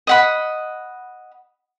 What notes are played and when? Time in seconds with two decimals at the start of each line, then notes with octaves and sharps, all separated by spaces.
0.07 D#5 F#5 B5